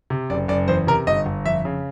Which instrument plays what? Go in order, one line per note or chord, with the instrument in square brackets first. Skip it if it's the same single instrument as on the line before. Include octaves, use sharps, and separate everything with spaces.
[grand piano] C3
F#1 D5
F#1 D5
E2 C5
C3 A#4
G1 D#5
G1
F2 E5
C#3